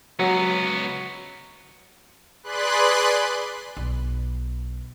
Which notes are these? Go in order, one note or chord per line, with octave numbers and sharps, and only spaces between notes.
C#2 F#3 B3
G#4 B4 D5 B5 C6 F#6
B1